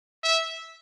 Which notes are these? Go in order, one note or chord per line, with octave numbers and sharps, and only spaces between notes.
E5